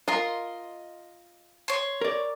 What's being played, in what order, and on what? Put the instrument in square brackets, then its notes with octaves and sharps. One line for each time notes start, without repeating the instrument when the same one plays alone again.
[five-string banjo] F4 A#4 [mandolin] D#5 C6
[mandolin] C#5 C6
[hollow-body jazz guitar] A#4 D5